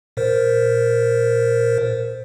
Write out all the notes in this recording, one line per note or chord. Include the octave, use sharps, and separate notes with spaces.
A#2 A#4 C5